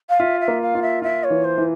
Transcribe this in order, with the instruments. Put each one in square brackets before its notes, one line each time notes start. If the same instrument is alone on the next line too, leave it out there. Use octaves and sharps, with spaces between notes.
[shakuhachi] F5
[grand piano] F4 [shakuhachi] E5
[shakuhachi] E5
[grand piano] A#3
[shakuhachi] F5
[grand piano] F4
[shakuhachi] E5
[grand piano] F4 [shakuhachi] E5
[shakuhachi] C#5
[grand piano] E3
[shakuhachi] C5
[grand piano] E3